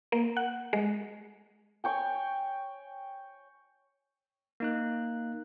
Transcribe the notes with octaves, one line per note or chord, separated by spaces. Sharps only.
A#3
F#5
G#3
C#5 G5 G#5
A#3 D#4 F#6